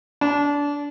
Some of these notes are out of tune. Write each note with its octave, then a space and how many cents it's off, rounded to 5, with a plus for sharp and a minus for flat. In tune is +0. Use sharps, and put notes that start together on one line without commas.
D4 -25